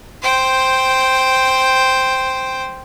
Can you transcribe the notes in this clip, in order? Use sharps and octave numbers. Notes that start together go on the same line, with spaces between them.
C5 G5